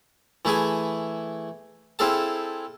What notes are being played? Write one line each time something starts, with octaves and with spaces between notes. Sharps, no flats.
E3 A3 E4 G#4 G#5
C4 E4 G#4 A4 F5 A5